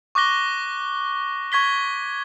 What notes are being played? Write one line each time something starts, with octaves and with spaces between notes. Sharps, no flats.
C#6 D6 F#6 A#6 G7
C#6 G#6 B6 G7